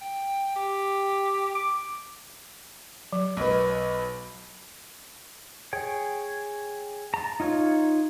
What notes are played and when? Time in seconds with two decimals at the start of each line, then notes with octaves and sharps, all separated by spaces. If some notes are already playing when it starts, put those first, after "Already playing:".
0.01 G5
0.56 G4
1.55 D6
3.13 F#3
3.37 B1 B4
5.73 G#4 C#5 G5
7.14 A5 A#5
7.40 D#4 F4 C#5